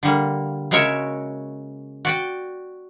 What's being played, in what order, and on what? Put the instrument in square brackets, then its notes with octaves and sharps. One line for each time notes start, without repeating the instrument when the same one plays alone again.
[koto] D3 G3 A#3
C#3 G#3 F#4 A#4 C#5 E5
F#4 D5 G5